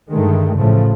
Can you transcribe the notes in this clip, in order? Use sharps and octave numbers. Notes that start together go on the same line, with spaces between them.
G2 D3 D#3 G#3 A3
A1 A2 C#3 F3 A3